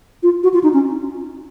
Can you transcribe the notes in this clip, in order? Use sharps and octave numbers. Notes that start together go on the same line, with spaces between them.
F4
F#4
F4
D#4
C#4